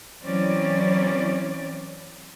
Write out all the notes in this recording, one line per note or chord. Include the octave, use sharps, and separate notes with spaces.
E3 F#3 C4 C#4 D5